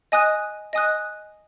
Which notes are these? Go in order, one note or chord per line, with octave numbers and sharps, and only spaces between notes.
D#5 G#5 D#6 F#6
D#5 G#5 D#6 F#6